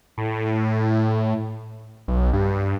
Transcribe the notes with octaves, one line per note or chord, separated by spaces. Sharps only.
A2
B1
G2